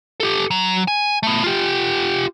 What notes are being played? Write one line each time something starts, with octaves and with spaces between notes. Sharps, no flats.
G4 A4
F#3
G#5
A3 B3
F4 G4